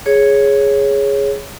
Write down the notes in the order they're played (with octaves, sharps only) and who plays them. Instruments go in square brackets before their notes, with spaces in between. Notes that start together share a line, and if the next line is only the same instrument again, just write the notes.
[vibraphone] G#4 C#5